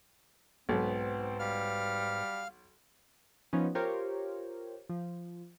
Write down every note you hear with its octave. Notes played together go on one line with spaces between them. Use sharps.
B1 G#2 B3 C4 B4
G3 F5 F6
F3 B3 C#4 D#4
F4 G4 A#4 C5 C#5
F3